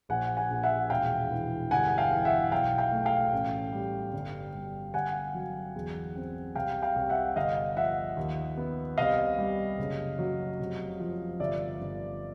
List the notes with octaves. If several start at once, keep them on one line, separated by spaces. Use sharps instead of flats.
A#1 F#5 G#5
F#5 G#5
A#1
E5 F#5
E1 F5 G5
E3
G1 F#5 G#5
F5 G5
E3
E5 F#5
B1 F5 G5
F5 G5
A3
F5 G5
A1
G3
G1
G3
G1 F#5 G#5
F#3
E2
C4
C2 F5 G5
F5 G5
C2
E5 F#5
G1 D#5 F5
F3 E5 F#5
D#2
B3
C2 D#5 F5
G3
F#1
F#3
F1
F3
G1 D5 E5
G1